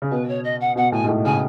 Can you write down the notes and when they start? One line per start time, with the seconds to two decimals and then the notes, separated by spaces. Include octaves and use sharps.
0.02 C#3
0.11 B2 B4
0.28 C#5
0.44 D#5
0.60 F#5
0.76 B2 F#5
0.92 A2 G#5
1.04 G#2
1.08 A2
1.25 C#3 G#5